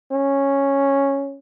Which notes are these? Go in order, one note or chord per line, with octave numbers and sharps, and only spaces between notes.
C#4